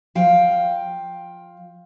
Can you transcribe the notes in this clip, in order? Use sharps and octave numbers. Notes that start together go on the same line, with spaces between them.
F3 F5 G5